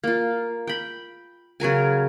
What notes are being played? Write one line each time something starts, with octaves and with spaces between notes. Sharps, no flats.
A#3 F4
G5 B5
C#3 F#3 A#4 G#5